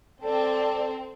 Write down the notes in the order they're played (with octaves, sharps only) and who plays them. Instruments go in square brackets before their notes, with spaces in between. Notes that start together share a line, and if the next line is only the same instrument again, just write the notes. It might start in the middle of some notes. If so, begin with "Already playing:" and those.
[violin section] C4 [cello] A4 [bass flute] D5